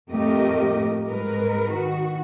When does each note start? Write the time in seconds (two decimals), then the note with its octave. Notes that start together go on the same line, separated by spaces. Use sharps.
0.11 F2 A2 A3 G4 A#4 D#5
1.09 G#2 G#3 A#4 B4
1.70 D#3 F#4